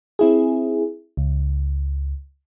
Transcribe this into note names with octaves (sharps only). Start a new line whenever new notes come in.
C4 E4 G#4
C#2